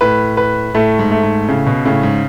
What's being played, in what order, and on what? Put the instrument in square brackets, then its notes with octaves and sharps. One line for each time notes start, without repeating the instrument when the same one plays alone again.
[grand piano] A2 [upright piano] B4
[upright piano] B4
[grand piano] A2 [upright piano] A3
[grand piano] G#2
[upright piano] A3
[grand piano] G#2
[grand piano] A2 [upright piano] C#3
[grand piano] B2
[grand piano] A2 [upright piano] C#3
[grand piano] G#2